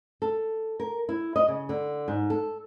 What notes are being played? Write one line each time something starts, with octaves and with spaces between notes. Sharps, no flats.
A4
A#4
E4
D#5
C#3
D3
G#2
A4